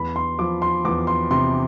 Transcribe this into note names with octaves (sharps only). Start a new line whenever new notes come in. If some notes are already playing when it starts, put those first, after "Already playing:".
Already playing: E2 B5
C6
F3 D6
C6
E2 D6
C6
C3 C6